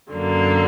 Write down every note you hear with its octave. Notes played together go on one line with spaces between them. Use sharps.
F#2 D3 F#3 A#3